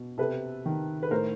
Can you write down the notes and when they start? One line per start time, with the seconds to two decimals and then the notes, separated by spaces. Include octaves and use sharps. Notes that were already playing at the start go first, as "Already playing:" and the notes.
Already playing: B2
0.18 C3 A4 B4
0.66 D#3
1.03 B4
1.11 A2 A#4 C5